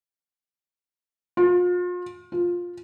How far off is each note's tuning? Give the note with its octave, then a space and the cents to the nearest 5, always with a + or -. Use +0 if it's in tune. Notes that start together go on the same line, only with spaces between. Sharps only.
F4 +35
F4 +10